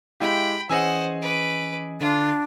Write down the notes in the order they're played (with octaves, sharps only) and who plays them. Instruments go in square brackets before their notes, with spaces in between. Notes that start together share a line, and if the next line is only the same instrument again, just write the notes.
[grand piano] G#3 E4 G4 [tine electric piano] F5 [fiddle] G5 B5
[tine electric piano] E3 C#4 D#5 [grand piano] G#4 G#5 E6 [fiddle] C5 F#5
[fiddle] B4 D6
[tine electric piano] D3 [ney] D4 [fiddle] F4